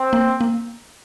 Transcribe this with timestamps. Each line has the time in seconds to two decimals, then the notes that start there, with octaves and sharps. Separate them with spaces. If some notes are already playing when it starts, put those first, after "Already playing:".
Already playing: C4
0.13 A#3
0.41 A#3